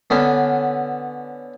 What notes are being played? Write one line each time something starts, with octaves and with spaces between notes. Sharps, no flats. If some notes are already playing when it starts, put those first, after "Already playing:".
D3 B3 C#4